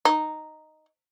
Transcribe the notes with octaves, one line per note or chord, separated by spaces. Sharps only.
D#4